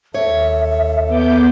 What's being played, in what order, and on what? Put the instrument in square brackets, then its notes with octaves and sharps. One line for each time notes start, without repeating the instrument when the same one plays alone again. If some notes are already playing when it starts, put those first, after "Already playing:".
[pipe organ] D#2 A4 [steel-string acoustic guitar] C#5 [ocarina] E5
[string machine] B3 D6 G6